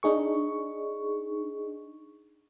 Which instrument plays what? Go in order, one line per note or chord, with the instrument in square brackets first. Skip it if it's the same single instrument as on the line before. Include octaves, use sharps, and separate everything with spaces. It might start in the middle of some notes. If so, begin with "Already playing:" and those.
[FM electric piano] D4 D#4 G#4 C#6